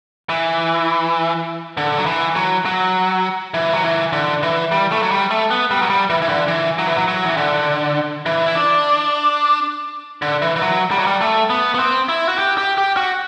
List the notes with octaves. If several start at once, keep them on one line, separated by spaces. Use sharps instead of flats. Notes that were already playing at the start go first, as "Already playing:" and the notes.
E3
D3
F#3
E3
F#3
F#3
E3
F#3
E3
D3
E3
G3
A3
F#3
G3
A3
B3
G3
F#3
G3
E3
E3
D3
E3
F#3
E3
F#3
F#3
E3
D3
E3
E4
D4
D3
E3
E3
F#3
G3
F#3
G3
A3
B3
B3
C4
E4
F#4
G4
G4
G4
F#4